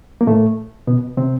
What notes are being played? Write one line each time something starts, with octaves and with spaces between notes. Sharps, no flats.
A#3
A2 A3
B2 B3
C3 C4